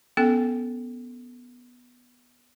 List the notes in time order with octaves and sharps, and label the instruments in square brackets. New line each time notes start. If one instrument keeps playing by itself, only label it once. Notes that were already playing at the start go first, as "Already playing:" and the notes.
[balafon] B3 C#4 A4 G5